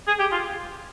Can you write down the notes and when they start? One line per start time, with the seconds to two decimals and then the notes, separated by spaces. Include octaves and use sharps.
0.07 G#4
0.19 G4
0.32 F4